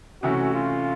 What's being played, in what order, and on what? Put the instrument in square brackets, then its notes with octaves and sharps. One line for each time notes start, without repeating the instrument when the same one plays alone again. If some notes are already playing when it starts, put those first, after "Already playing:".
[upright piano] C3 E3 A3 C#4 [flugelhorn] F#4
[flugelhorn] F4